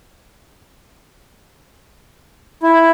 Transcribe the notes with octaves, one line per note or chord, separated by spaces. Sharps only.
E4